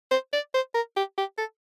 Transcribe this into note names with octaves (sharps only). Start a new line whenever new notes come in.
C5
D5
C5
A#4
G4
G4
A4